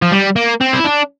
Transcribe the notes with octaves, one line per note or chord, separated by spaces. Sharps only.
F3
G3
A#3
C4
E4
D4